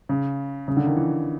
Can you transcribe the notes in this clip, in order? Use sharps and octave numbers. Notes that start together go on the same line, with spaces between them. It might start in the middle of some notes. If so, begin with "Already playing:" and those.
C#3
C#3
D3
D#3
E3